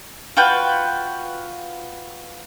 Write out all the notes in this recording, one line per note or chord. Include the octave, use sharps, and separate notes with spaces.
F4 F#4 B4 G5